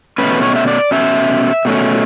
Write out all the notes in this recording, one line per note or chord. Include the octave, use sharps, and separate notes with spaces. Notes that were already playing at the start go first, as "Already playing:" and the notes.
B2 A3 C#4 B4
C#5
E5
D5
B2 A3 C#4 E5
B2 A3 C#4